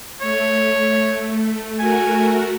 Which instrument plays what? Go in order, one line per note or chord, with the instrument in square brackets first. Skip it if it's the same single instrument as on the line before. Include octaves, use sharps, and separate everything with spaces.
[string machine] A3 [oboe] C#5
[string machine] A3 F#4 A#4 [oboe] G#5